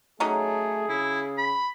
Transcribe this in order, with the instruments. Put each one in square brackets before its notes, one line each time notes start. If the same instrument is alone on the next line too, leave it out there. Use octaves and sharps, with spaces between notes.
[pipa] F#3 C#4 D#4 [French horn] A3 [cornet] G#4
[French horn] C#3 [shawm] E4
[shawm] B5